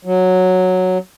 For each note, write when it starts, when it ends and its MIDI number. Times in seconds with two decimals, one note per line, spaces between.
0.05 0.98 54